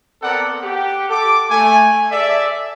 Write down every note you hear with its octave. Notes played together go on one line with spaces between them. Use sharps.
B3 C4 A4 A#4 D5 F#5
G4 F#5
A4 D6
A3 G#5
G#4 A4 D5 E5